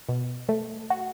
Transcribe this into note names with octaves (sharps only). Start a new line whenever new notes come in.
B2
A3
F#4